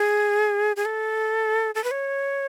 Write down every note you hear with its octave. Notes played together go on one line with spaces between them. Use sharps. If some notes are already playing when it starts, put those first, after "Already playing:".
Already playing: G#4
G#4
A4
A4
B4
C#5